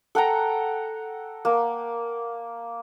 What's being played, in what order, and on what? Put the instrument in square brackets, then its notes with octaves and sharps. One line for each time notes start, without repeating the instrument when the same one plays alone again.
[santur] A4 F#5 G5 A#5
A#3